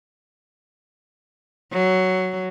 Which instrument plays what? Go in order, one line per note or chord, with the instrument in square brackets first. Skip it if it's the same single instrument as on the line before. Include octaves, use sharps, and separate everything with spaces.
[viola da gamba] F#3